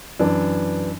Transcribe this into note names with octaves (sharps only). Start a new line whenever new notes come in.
F#2 E3 D4